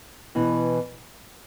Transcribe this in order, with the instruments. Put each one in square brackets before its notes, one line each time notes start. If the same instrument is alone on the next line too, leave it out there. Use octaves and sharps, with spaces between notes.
[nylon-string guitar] B2 E3